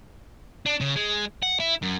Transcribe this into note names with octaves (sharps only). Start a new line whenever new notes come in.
D4
C#3
G#3
F#5
E4
F#2